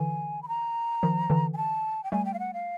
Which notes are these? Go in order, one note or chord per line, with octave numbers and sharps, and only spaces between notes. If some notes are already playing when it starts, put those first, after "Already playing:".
Already playing: D3 E3 G#5
B5
A#5
D#3 F3
D3 E3
G#5
A5
G5
G3 A3 G#5
G5
F5
F#5
F5